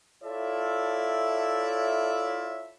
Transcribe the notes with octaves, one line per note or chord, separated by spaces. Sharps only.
E4 F4 A4 C#5 D5 E5